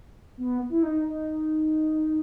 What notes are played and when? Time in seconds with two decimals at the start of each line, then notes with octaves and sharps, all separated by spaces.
0.37 B3
0.70 E4
0.83 D#4
1.06 D#4